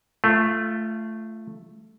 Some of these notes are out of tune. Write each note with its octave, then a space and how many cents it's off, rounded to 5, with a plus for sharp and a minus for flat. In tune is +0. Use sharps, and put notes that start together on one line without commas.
A3 +0 F4 -20